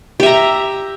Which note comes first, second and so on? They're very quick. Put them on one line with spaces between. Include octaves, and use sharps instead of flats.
G4 E5 A#5